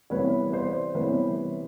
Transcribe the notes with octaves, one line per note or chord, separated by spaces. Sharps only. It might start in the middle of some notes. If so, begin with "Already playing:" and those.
C3 E3 G3 B3 B4 C#5
C5 D5
C3 E3 G3 B3 B4 C#5